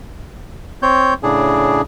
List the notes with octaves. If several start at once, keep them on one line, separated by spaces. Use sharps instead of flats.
C4 C#5 G6
A2 C#3 D4 G#4